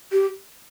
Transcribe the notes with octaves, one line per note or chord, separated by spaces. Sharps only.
G4